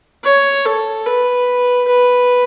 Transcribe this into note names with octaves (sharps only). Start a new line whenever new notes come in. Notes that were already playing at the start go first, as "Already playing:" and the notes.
C#5
A4
B4
B4